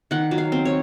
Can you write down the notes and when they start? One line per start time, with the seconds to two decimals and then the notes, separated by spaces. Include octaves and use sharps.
0.11 D#3 F#5
0.31 F#3
0.38 F5
0.52 C4
0.65 C#5